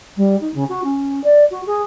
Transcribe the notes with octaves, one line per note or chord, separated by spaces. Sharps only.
G3
D#4
C#3
F#4
C#4
D5
F#4
G#4